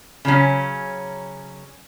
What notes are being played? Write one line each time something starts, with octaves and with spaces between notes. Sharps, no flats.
C#3 F#3 C#4